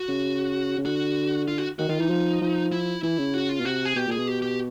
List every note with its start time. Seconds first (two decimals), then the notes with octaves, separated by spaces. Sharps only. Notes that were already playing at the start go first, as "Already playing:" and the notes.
Already playing: F#4
0.08 C#3
0.78 C#3
0.85 D3 F#4
1.48 F4
1.58 F#4
1.79 D#3 F#4
1.89 D#3 F4
2.00 E3 D#4
2.10 F3
2.41 F3
2.72 E4
3.03 E3 E4
3.19 C#3
3.34 F#4
3.49 F4
3.60 B2
3.65 C3 F#4
3.85 G#4
3.96 B2 G4
4.08 A#2 G#4
4.18 B2
4.27 G4
4.42 G4